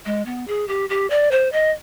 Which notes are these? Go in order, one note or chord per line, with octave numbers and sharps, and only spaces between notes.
G#3
B3
G#4
G4
G4
D5
C5
D#5